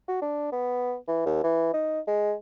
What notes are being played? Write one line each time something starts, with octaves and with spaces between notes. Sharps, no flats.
F#4
D4
B3
E3
D#2
E3
D#4
G#3